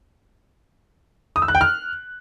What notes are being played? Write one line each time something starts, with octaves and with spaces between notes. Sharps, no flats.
D#6
E6
F#6
G5
F6